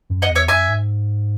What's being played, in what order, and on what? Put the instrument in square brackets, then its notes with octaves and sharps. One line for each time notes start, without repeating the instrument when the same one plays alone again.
[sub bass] F#2
[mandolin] D#5 F#5
[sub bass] E2
[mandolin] C#5 E5
[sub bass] F#2 [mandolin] E5 G#5
[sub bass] G#2